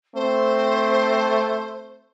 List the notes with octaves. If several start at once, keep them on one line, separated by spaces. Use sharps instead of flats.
A3 C4 C5